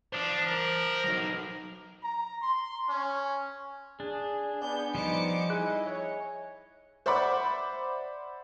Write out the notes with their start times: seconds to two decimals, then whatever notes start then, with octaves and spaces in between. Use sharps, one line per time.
0.13 D4 C5 A5
0.47 A#4
1.04 F#3 D#4
2.03 A#5
2.42 C6
2.89 C#4
4.00 D4 G#4
4.62 B3 D5 G#5 G6
4.95 F3 G3 D#4 C5 D6 C#7
5.50 E4 G#4 D#5 G#5 F#6
5.86 C#5
7.06 C5 D5 E5 F#5 B5 D6